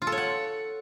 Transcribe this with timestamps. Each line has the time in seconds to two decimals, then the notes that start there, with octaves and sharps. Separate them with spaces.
0.02 F4
0.07 A4
0.12 C#5
0.18 F#5